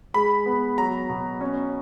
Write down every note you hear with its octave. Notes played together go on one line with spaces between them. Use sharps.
G#3 B5
B3
F#3 A#5
B2
C#4